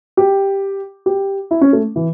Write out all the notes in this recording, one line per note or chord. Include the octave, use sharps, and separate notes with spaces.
G4
G4
E4
C#4
A3
E3